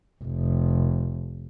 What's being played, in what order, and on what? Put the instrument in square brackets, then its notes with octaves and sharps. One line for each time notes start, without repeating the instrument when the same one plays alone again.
[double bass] F1